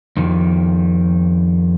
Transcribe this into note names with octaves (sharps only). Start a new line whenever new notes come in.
F2 D#3